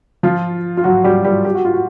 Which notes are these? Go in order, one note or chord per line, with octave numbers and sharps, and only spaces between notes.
F3 F4
F4
F#3 F#4
G3 G4
G3 G4
G4
F#4
F4
F#4